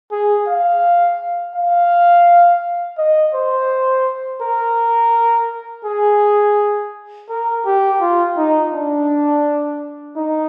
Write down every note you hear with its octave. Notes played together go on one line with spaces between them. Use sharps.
G#4
F5
F5
D#5
C5
A#4
G#4
A#4
G4
F4
D#4
D4
D#4